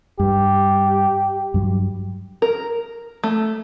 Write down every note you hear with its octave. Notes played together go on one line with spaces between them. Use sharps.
G2 G4
G2 F#3
A#4
A3